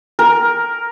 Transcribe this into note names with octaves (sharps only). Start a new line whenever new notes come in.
A#4